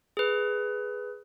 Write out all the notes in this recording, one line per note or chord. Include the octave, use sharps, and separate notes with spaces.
G#4 B4